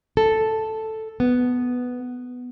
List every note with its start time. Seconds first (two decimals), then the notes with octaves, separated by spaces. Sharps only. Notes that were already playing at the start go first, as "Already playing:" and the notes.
0.17 A4
1.20 B3